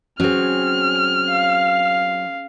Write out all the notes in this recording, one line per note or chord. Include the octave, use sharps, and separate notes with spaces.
F#3 C4 C#4 G#4 F6
F5